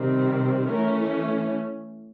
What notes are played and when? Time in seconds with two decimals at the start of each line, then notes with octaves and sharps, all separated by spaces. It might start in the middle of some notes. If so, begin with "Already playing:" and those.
Already playing: C3 D#3 G3 C4
0.68 E3 A3 C#4 A#4